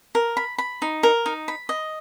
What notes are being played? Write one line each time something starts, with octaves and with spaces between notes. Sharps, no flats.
A#4
B5
B5
D#4
A#4
D#4
B5
D#5